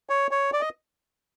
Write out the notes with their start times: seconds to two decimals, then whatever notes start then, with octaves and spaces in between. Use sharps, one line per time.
0.10 C#5
0.31 C#5
0.53 D5
0.61 D#5